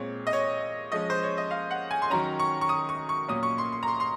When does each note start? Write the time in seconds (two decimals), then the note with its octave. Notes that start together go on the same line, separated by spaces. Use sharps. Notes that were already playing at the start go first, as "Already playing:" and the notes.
Already playing: A#2 G#3 C4 C#5
0.27 D#5
0.33 C#5
0.92 F3 G#3 C#4 D#5
1.10 C5
1.23 C#5
1.38 D#5
1.51 F5
1.71 F#5
1.91 G#5
2.02 C6
2.10 D#3 F#3 C#4 A#5
2.40 C#6
2.61 C#6
2.69 D#6
2.89 C#6
3.09 C#6
3.28 A#2 F#3 A#3 C#4 D#6
3.43 C#6
3.58 C6
3.72 C6
3.83 A#5
3.88 C6
4.00 C6